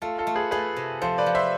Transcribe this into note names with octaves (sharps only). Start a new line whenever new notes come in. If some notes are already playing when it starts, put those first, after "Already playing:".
A3 F4 A4
F4 A4
A3
G#4 B4
A3 G#4 B4
C3
F3 A4 C5
B4 D5
F3
C5 E5